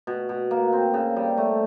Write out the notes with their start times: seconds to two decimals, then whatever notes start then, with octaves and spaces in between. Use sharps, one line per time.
0.07 B2
0.29 B2
0.51 A#3
0.73 C4
0.94 C#3
1.16 G3
1.37 A3